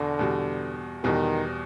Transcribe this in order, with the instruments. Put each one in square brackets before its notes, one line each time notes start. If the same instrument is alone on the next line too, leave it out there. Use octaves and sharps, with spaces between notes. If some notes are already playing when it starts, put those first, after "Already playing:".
Already playing: [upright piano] E2 B2 [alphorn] D3
[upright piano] E2 B2 G3
[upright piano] E2 B2 G3 [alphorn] D#3